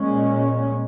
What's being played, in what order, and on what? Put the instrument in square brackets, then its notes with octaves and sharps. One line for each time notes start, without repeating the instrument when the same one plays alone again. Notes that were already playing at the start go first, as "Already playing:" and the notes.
Already playing: [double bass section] A#2 G#3 C#4